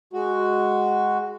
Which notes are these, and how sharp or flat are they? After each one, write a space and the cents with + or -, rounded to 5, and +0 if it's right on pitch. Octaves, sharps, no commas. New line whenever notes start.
G#3 +0 F#4 +0